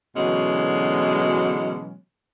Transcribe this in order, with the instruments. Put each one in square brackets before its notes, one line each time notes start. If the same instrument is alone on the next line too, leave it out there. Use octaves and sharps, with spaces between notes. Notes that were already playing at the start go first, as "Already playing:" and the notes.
[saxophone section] B2 D3 E3 F#3 G#3 C#4